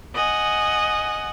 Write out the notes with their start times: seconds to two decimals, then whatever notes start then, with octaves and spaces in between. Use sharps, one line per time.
0.14 D#5 F#5 G#5